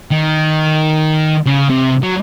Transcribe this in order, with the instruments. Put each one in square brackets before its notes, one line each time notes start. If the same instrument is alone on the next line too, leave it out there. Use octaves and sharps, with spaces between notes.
[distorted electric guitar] D#3
C#3
C3
F#3